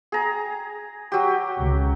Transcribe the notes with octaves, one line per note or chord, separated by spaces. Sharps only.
G#4 A#5
F#3 G4
C#2